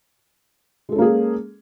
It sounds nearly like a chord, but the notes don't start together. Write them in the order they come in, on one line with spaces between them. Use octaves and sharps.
G#3 A4 C#4 A#3 G#4